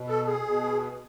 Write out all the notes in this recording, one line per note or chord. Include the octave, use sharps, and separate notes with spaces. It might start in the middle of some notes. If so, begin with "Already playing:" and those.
Already playing: B2
A4
G#4
B2